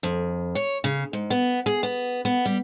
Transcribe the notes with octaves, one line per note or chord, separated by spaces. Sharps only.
F2
C#5
C#3
G#2
B3
G#4
B3
B3
G3